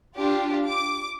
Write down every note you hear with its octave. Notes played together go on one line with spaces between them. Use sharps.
D4 F4 G4
D6